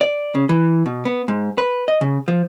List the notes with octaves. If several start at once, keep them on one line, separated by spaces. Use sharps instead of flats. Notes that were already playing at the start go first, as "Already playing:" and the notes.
D5
C#3
E3
B2
B3
G#2
B4
D#5
C#3
F3